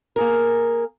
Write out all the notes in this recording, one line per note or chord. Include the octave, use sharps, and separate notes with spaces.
A#3 G#4 A#4